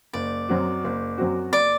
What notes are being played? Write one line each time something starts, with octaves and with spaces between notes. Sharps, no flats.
F#1 D5
F#2 F#3 C4 F#4
F#1
F#2 F#3 C4 F#4
F#1 D5